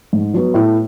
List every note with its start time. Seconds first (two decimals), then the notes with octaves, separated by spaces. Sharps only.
0.13 G#2
0.34 F#3 B3
0.54 A2